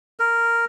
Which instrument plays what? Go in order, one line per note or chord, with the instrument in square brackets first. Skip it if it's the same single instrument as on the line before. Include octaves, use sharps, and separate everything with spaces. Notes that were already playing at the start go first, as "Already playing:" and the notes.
[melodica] A#4